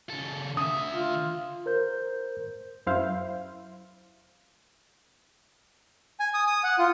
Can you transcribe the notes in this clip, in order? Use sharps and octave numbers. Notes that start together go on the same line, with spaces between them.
C#3 A4
D3 E5 D#6
F4
A#4 C5 G6
F#2 E4 C5 F5
G#5
D#6
D#6
F#5
F4